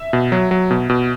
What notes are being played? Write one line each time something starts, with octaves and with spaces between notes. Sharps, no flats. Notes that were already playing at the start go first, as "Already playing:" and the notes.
Already playing: E5
B2
F#3
F#3
B2
B2